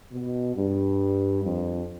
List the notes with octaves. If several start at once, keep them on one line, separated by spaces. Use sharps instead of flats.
B2
G2
F2